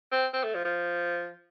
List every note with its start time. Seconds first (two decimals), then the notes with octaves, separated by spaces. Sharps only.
0.12 C4
0.34 C4
0.44 A3
0.55 F3
0.65 F3